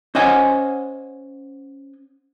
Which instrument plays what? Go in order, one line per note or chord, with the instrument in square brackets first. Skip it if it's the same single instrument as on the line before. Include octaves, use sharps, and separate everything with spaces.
[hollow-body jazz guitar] C#4 C5 D#5 F#5 G#5